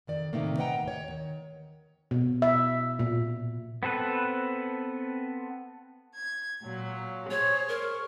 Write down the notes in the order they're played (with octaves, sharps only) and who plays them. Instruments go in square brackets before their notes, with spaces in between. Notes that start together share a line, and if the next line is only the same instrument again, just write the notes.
[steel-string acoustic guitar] F2 D#3 D5
A2 C3 D#3 A3 A#3
B4 D#5 F#5 G5 A#5
D#2 C#5
D#3
[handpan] B2
E5
A#2
[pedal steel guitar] B3 C4 A4 B4
[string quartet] G#6
A#2 F#3
[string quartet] G#4 C5 C#6 [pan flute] C#5
[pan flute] A#4